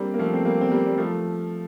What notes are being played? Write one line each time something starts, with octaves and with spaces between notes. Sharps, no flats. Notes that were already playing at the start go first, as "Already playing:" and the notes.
Already playing: G3 A#3 C4 D4
A#3
F3 A3
C4
G3 A#3
C4
G3 A#3
G3
F3 A3